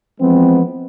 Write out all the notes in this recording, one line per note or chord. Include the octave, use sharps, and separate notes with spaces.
E3 F3 G#3 B3 C4